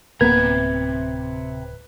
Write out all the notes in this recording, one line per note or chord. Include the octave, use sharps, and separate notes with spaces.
D1 C3 A#3 B3 B4 A#5 G#6